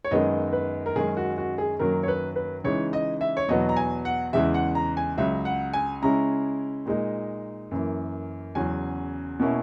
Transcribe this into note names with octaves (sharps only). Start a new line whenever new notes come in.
C#5
F#2 D#3 G#3 B3 D#4 D#5
B4
A#4
F#2 D#3 G#3 C#4 G#4
F#4
F#4
G#4
F#2 D#3 F#3 A#3 A#4
C#5
B4
B4
C#3 E3 G#3 D#4 C#5
D#5
E5
C#5
E2 B2 F#3 B3 D#5
A#5
G#5
F#5
E2 C#3 E3 G#3 E5
F#5
A#5
G#5
C#2 C#3 F#3 E5
F#5
G#5
C#3 G#3 C#4 E4 A#5
A#2 G#3 D#4
F#2 E3 A#3
E2 C#3 F#3 C#4 G#5
B2 A#3 C#4 E4